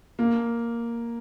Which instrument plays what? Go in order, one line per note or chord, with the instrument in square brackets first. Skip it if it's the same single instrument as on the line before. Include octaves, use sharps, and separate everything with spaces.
[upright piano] A#3